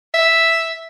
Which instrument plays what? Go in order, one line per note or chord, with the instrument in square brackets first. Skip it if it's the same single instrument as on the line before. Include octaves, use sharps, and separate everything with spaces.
[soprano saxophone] E5